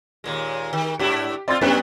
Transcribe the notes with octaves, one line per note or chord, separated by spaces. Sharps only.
D#2 A#2 G#3
D#3
G#2 D4 E4 G4
C4 F4 D5 C6 A6
F#2 G3 B3 C#4 F#6